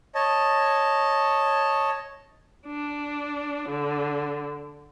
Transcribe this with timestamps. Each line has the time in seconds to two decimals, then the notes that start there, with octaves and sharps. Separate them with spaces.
0.15 C#5 D#5 A5
2.67 D4
3.68 D3